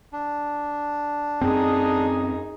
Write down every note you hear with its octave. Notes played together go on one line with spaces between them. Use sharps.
D4
F#2 C4 D#4 G#4